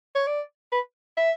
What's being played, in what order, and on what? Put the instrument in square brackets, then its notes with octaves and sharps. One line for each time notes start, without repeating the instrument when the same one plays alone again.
[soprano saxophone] C#5
D5
B4
E5